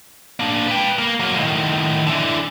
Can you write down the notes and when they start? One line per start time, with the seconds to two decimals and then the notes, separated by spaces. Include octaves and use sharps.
0.40 A#3 D4
0.68 B4 G5
0.99 A#3
1.20 F#3 A#3
1.37 A2 D#3
2.07 D3 E3